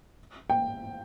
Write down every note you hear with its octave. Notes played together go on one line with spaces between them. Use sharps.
G5